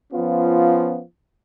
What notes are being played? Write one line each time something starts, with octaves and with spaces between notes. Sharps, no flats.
F3 B3 C#4 F4